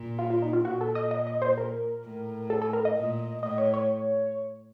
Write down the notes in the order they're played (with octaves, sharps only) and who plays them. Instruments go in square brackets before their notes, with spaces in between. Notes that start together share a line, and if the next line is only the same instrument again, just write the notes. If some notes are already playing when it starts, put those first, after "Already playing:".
Already playing: [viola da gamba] A#2
[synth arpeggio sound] F4
F4
D#4
F4
[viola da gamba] A#2 [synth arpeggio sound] F#4
[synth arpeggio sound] A4
D#5
D#5
D#5
C5
A#4
[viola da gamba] A2
[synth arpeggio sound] A4
A4
A#4
D#5
[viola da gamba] A#2
[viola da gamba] A2 [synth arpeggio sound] D#5
[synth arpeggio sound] C#5
C#5